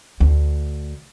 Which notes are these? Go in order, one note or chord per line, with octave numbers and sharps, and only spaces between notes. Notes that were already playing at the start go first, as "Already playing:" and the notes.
D2